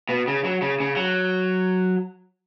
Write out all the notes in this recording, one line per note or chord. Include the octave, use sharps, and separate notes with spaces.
B2
C#3
F#3
C#3
C#3
F#3